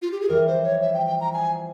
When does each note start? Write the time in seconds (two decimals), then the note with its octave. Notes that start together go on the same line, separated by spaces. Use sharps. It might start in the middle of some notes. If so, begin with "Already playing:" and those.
0.02 F4
0.12 G4
0.21 G#4
0.29 F2 E3 G3 A#4
0.47 C5
0.63 C#5
0.82 E5
0.94 G5
1.06 G5
1.21 A#5
1.33 G#5